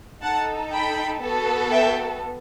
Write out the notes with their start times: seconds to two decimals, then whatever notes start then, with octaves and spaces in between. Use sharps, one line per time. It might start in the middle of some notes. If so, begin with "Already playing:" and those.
0.22 D#4 A4 F#5 A5
0.72 G5 B5
1.22 B3 F#4 A4
1.71 E5 G5